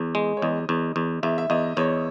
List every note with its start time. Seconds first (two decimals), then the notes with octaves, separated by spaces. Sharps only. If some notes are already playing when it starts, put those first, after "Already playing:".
Already playing: E2
0.15 G#3
0.37 C#5
0.42 E2 D#5
0.69 E2
0.96 E2
1.23 E2 E5
1.38 E5
1.50 E2 D#5
1.77 E2 C#5